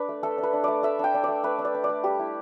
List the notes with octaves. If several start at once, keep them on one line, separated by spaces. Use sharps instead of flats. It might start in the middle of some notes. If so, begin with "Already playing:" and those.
Already playing: D4 B4 D5
A3
A3 A4
D4
B4
D4
A3 D5
A3 E5
D4 G5
D4
A3 D5
A3 B4
D4
D5
D4
D5
A3
G3 G4
E4